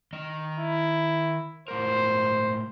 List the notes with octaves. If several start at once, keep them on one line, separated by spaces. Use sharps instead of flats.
D#3 D#5
E4
A2 G#3 A#4 C5